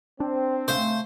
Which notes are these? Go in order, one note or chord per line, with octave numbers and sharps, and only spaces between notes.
C4 D4
C#3 A3 C5 F5